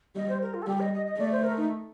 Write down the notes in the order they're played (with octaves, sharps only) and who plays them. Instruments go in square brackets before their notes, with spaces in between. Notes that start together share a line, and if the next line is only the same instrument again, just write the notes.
[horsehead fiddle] G3 [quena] D#5
[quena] C5
A#4
F4
A4
[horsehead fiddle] G3 [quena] G4
[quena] D#5
D#5
D#5
[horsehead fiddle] A3 [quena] D5
[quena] C5
A#4
D#4